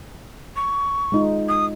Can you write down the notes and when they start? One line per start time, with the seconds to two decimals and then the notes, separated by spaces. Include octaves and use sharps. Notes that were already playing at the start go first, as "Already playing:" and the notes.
0.56 C#6
1.12 G#3 D#4 F4
1.49 D#6